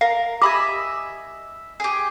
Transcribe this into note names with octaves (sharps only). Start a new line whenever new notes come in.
A#4 F5
G4 D#5 E5 G#5 B5
G4 G#4